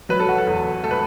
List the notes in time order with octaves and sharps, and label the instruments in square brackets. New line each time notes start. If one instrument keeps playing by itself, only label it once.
[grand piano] F#3 B4
A4
F#4
A4
E2
A3 A4
B4